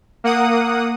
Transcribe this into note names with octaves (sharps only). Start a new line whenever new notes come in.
A#3 F#5 D#6